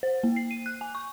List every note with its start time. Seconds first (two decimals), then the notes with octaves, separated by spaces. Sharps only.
0.03 C5
0.24 A#3
0.36 C7
0.51 D#7
0.66 F#6
0.81 G#5
0.95 C#6